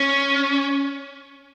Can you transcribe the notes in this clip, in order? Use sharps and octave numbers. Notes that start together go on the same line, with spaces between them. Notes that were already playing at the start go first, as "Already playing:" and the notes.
Already playing: C#4